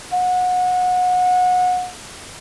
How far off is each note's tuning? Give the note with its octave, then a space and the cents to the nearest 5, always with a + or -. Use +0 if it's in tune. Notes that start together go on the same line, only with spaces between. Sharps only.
F#5 -25